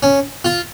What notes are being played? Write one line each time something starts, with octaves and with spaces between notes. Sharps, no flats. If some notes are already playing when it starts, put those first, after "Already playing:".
C#4
F4